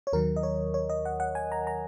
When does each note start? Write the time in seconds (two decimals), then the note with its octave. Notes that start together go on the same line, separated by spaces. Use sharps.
0.07 C#5
0.13 D#2 D#3 F#3 A#4
0.36 D#5
0.43 C#5
0.74 C#5
0.89 D#5
1.05 F#5
1.20 F#5
1.35 G#5
1.52 A#5
1.67 A#5